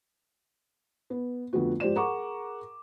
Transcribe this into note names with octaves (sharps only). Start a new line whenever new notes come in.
B3
F2 D3 A3 B3 F#4
G#2 F3 G4 C5 D5 E7
G#4 A#4 F#5 A#5 C#6 D6